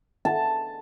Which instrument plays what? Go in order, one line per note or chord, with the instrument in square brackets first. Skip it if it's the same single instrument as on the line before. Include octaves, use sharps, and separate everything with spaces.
[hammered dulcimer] A5